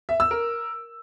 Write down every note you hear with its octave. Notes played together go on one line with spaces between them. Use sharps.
E5
E6
A#4